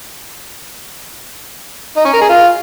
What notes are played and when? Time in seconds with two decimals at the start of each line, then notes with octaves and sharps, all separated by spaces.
1.97 D#4
2.05 C#4
2.13 A#4
2.21 G#4
2.29 F4